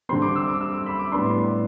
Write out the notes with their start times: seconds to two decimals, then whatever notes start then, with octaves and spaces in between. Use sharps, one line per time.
0.09 D3 G3 C4 C6
0.22 D6
0.36 E6
0.48 D6
0.61 E6
0.73 D6
0.86 B5
0.99 D6
1.12 A2 G3 B3 D4 C6